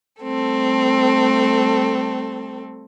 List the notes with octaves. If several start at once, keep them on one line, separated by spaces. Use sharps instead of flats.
G3 A3 C4 A4